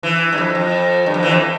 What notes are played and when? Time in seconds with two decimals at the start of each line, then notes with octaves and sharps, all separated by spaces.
0.03 E3
0.32 G2
0.38 F2
0.55 F2
1.06 G2
1.14 F2
1.23 E3
1.31 F2